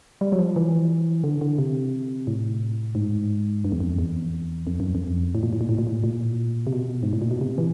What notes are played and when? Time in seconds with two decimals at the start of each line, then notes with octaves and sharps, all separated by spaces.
0.21 G3
0.32 F#3
0.39 F3
0.56 E3
1.24 D3
1.41 D3
1.58 C3
2.27 A2
2.95 G#2
3.65 G2
3.72 E2
3.80 F2
3.99 E2
4.67 F2
4.80 F#2
4.95 F2
5.35 A2
5.43 A#2
5.53 A2
5.61 A#2
5.69 A2
5.78 A#2
5.87 A2
6.04 A#2
6.67 C3
6.73 B2
7.03 G#2
7.13 A2
7.22 A#2
7.31 B2
7.41 C3
7.58 E3